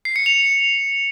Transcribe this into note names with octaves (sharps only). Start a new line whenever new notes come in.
C7
C#7
F7